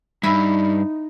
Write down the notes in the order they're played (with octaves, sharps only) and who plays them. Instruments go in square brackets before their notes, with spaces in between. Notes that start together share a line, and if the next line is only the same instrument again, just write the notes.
[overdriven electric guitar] G2 [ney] D#4 [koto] E4 E5 G#5